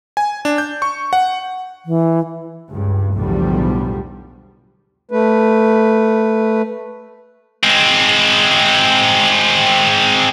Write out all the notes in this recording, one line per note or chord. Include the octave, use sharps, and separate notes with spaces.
G#5
D4
G6
C#6
F#5
E3
C#2 G2
B1 E2 A2 D3 F3 G3
A3 B4
G#3 C4